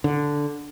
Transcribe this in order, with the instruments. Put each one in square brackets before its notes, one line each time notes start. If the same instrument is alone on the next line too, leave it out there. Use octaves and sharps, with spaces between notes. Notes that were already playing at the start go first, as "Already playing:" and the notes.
[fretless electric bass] D3